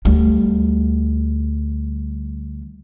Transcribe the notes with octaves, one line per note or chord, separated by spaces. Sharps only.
D2 G3